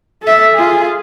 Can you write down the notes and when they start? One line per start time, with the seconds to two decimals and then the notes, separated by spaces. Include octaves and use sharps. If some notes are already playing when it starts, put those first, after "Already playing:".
0.23 A4 E5
0.55 F4 G#4